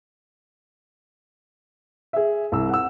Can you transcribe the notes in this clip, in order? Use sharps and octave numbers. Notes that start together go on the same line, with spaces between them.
G#4 E5
C2 E6
F#5 E6